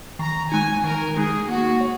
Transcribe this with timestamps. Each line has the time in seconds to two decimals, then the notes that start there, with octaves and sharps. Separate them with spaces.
0.19 D#3 A#5
0.51 G#3 D#4 G#5
0.84 D#3 A#4
1.16 G#3 D#4 G#4
1.48 A#3 F#4
1.81 C#5